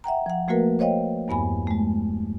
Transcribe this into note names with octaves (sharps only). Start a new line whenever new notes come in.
E5 F#5 G5 A#5
F3 F#5
F3 A3 A#3 F#4 A#4 B4
C5 C#5 D#5 F5 G5
E2 G2 B3 G#5 B5
G#3 A3